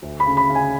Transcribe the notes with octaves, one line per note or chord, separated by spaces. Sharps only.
D2
B5
C#3
B5
C#3
G#5